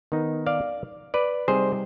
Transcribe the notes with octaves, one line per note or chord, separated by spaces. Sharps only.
D#3 B3 D#4
D5 F5
B4 D5
C3 G3 C4 D#4 G#4 C5